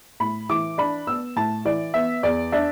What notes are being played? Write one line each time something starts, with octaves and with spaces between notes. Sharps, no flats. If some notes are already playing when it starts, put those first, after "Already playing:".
A2 B5
E3 D6
D4 B5
B3 E6
A2 A5
E3 D5
B3 E5
E2 D5
D4 E5